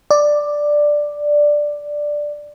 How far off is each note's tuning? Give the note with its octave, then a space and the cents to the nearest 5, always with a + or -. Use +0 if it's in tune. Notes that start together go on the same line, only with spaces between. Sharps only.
D5 +5